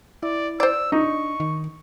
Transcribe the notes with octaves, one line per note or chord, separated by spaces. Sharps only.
E4 D5
C5 D5 E6
D4 D#4 C#6
D#3